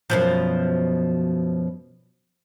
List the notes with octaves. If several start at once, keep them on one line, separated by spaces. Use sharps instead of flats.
F#2 B2 F3